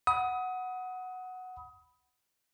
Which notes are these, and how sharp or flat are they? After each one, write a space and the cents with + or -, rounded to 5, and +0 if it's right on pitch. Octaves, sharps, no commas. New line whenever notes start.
F#5 +0 B5 +0 D#6 +25